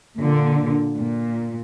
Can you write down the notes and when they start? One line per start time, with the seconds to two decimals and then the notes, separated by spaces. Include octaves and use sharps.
0.17 A#2 D3
0.97 A#2